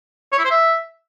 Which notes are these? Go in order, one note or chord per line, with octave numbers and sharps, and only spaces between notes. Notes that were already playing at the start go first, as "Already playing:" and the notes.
C#5
E4
C5
E5